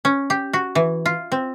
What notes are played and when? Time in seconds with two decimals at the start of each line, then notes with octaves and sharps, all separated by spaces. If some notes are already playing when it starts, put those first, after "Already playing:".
0.05 C#4
0.30 G4
0.53 F#4
0.75 E3
1.06 F4
1.32 C4